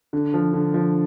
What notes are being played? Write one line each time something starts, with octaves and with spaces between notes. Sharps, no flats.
D3
F3
D3
F3